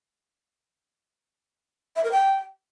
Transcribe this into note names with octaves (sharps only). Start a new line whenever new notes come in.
E5
A#4
G5